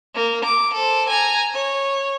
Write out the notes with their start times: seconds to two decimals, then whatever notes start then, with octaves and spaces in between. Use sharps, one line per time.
0.15 A#3
0.45 D6
0.74 A4 C5
1.09 G#5 A#5
1.54 C#5